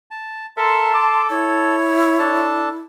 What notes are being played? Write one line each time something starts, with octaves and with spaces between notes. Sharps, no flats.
A5
A4 A#4 E5 A5 C6
A4 D6
E4 C#5 G#6
D4 A4 A5